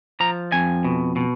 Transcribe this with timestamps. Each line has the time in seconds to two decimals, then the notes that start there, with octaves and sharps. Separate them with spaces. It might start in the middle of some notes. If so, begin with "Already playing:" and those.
0.20 F3 A#5
0.52 F2 G#5
0.85 B2
1.16 B2